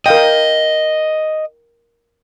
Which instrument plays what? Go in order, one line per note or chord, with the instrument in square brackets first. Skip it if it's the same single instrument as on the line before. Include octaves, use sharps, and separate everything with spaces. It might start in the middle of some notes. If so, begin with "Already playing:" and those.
[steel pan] A#4 F5 G5 [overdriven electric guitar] D#5